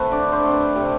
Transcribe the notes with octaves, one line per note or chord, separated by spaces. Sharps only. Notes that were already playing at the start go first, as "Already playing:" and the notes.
Already playing: A3 C4 B4
D3 D5
C5
A3 C4
B4
C3 G4